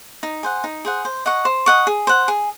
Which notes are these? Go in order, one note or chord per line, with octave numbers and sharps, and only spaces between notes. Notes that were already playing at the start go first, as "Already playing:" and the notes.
D#4
G#4 C5 F#5
D#4
G#4 C5 F#5
C5
D#5 F#5 C#6
C5
D#5 F#5 C#6
G#4
C5 F#5
G#4